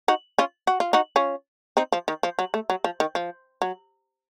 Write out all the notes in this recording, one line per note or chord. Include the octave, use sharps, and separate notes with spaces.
D#4 F#4
C#4 F4
F#4
F4
D#4 F#4
C#4 F4
C4 D#4
F3
D#3
F3
F#3
A3
F#3
F3
D#3
F3
F#3